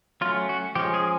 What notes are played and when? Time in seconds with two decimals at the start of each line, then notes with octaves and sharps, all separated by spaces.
0.21 F#3 A3 C#4 F4
0.49 F#4
0.75 F3 G#3 C#4 G4
0.94 G#4